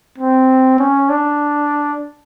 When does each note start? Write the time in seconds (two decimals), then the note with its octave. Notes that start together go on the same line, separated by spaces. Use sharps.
0.18 C4
0.79 C#4
1.10 D4